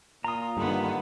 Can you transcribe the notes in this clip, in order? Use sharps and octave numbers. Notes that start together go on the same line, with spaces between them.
A#2 F4 A#5 D#6
G2 D3 D#3 B3